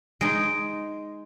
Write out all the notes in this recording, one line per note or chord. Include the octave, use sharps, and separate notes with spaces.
G#3 D#4 D7